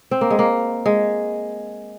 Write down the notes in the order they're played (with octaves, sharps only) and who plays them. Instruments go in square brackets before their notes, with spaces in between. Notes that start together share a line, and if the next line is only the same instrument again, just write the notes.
[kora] C4
A#3
G#3
A#3
G#3